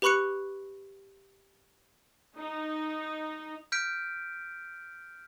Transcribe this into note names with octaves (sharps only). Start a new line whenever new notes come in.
G4 B4 B5 C#6 F#6 C#7
D#4
F6 G6 B6 D7